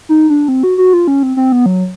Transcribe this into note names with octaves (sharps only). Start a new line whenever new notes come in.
D#4
D4
C4
F#4
F#4
F4
C#4
C4
C4
B3
F#3